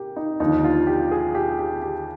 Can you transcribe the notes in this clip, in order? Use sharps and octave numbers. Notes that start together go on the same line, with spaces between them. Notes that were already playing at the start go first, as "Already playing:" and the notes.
Already playing: G4 A#4
D#4
D#2 D3 F3 D#4
F4
G4
G#4
G4
G4
G4